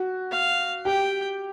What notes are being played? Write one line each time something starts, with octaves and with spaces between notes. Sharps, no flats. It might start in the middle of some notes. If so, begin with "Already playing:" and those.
Already playing: F#4
F5
G4 G5